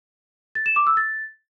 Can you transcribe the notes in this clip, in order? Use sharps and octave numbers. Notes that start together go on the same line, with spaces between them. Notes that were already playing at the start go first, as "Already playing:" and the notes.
A6
E7
D6
E6
A6